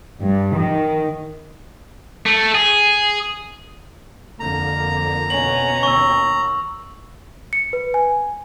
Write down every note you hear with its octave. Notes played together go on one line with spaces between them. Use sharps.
G2
D#3
A3
G#4
F2 D3 A#3 A#5
B2 C#4 F#7
D#2 C#6 E6
C#7
B4
G#5